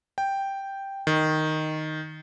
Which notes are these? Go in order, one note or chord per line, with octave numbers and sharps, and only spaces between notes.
G5
D#3